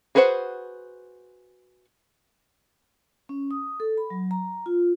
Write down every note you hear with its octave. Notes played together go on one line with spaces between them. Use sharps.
F#4 G#4 B4 C5 F#5
C#4
D#6
A4
B5
F#3
A#5
F4